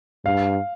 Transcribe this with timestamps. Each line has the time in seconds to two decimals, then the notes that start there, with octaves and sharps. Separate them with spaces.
0.25 G2 F5